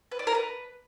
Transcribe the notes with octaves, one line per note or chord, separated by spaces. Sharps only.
B4
D5
A#4
B4